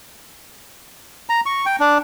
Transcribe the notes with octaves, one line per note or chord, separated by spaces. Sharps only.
A#5
C#6
G5
D4